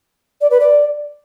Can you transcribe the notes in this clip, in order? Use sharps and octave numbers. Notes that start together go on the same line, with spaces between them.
D5
B4
D5